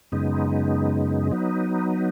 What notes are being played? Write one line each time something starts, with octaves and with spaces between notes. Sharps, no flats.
F#2 C#3 G#3 B3 D#4
F#3 B3 D#4